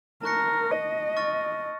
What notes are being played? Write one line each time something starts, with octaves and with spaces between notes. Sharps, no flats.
A#4 A5 C#6 F#6 A#6 C#7
D#5
C#6 F6 A6